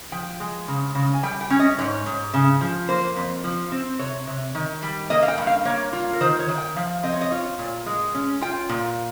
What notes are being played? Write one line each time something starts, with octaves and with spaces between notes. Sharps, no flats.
F3 G5
G#3
C#3
C#3
G#5
G3 G5
G5
C#4
D#5
G#2 C#5
G#2
C#3
F3
A#3 C5
F2
F3
C4
C3 C#5
C3
D#3
G3
A#3 D#5
F5
G5
G2
F5
A#3 C#5
F4
A#4
D#3 C5
C#5
D#3
G5
F3 F5
C4 D#5
C#5
D#5
F4 C#5
A#2
G#3
C#4
F4 G5
A#2